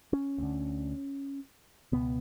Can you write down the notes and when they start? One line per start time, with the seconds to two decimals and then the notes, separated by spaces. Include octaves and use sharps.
0.13 C#4
0.38 D2 D3
1.92 C#2 B2 B3